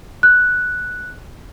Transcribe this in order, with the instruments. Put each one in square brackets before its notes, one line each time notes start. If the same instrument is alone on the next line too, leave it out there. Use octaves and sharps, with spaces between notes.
[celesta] F#6